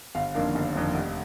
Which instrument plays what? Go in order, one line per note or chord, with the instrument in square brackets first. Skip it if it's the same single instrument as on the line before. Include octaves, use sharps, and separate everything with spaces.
[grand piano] G1 F5
F2 D#3 A#3 D4
G1
F2 D#3 A#3 D4
F1